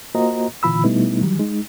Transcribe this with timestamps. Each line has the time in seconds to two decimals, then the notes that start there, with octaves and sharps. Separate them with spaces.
0.15 A#3 F4 F#4 C5 D#5 A#5
0.63 A#2 D3 E3 F4 B5 E6
0.84 B2 G3 A3 B3 D#4 E4
1.21 D#3 E3 F#3 G3
1.39 G#3 D#4